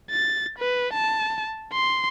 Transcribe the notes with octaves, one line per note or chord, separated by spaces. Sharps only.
A6
B4
A5
C6